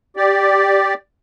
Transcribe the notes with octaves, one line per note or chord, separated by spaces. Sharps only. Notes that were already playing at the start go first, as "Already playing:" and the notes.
G4 D5